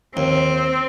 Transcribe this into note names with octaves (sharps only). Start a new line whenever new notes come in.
D#2 C4